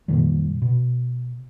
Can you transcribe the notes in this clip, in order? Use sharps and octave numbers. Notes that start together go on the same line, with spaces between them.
F2 A#2 D#3 G3
B2